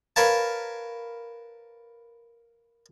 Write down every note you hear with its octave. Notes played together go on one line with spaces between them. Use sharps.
A#4 B4 C#5 F5 A5